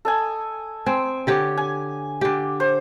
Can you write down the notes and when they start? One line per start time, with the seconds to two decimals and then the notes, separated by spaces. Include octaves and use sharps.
0.05 A4 D#5 G#5
0.86 C4 G#5
1.27 D3 G4 C#5
1.57 G#5
2.21 D3 G4
2.60 C5